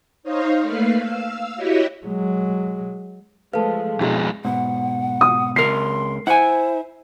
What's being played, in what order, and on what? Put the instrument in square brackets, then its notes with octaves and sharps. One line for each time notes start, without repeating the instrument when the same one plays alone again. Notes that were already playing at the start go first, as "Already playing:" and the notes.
[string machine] D#4 C5 C#5 D#5 F5
A3 A#3 B4 F5 C7
F5 E6
E4 F#4 G4 C#5 D#5 E5
[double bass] F#3 G#3
[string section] F3 G#3 A3 [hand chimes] A4 F5 [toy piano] B4 A5
[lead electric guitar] F2 G#3 [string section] B2 [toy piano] D4 E4 F#4
[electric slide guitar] G#2 B2 [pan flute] F#5
[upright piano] D#6
[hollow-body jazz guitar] C#2 A#4 [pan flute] C6 [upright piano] C7
[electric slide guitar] E4 [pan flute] C5 [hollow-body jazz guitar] F#5 G#5